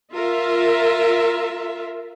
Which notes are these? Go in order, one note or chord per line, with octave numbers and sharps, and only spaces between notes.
F4 A#4 E5